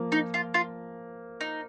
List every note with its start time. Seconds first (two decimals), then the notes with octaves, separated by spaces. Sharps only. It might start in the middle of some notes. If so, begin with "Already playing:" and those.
Already playing: F3 A#3
0.12 D#4
0.34 F4
0.54 F4
1.41 D#4